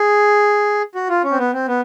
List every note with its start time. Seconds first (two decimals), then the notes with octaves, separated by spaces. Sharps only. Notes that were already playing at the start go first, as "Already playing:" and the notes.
Already playing: G#4
0.95 F#4
1.09 F4
1.24 C#4
1.31 C4
1.38 B3
1.53 C4
1.68 B3